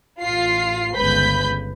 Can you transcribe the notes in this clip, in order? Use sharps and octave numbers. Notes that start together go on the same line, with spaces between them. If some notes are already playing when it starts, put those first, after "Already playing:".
A1 F4 C7
G1 C#2 B4 B5 G6 B6